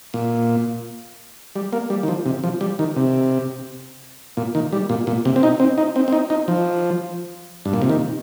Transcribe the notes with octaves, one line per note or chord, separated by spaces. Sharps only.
A#2
G3
A#3
G3
D#3
F3
C3
F3
G3
D#3
C3
A#2
D#3
G3
A#2
A#2
C3
C4
D#4
C4
D#4
C4
C4
D#4
D#4
F3
G2
A#2
C3
D#3